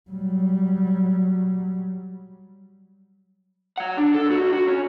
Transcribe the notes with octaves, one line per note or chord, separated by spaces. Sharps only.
F#3 G3
F#3 F#5
D4
A4
C2 F#4
F#4
C#4